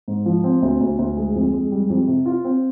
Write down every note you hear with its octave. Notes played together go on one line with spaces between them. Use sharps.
G#2
F3
C4
D2
D2
D2
G#3
F2
G#3
G3
F2
C3
F4
C4